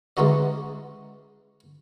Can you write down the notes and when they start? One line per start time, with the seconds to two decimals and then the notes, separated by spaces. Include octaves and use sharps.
0.17 E3 G#3 C#4 D#4 F#4 D#5